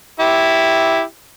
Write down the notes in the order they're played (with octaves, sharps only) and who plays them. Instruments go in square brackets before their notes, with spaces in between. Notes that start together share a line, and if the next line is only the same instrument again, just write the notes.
[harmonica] E4 G4